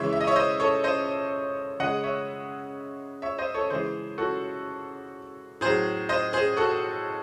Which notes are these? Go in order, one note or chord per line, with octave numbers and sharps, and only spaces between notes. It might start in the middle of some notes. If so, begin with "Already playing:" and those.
Already playing: C#3 E3 G#3 C#5 E5
E5
D#5
C#5 E5
C5 D#5
A4 C#5
C5 D#5
C#3 G#3 D#5 F#5
C#5 E5
C#5 E5
C5 D#5
A4 C#5
C#3 E3 G#3 G#4 C5
F#4 A4
A2 F#3 G#4 C5
C5 D#5
G#4 C5
F#4 A4